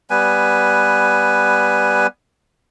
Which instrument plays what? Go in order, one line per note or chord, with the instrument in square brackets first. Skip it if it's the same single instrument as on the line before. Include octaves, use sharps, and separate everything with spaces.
[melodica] G3 B3 B4 G#5